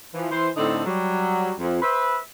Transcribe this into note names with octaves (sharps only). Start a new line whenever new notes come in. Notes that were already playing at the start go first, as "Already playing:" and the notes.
E3 F3
E3 C5
A2 D3 C4 D#4 A4 D5
F#3 G3
F2
B4 C5 E5